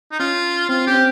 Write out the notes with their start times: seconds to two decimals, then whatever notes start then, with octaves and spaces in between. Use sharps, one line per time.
0.12 D#4
0.20 C#4 F4
0.69 C4 F4
0.87 C#4 G4
0.94 C4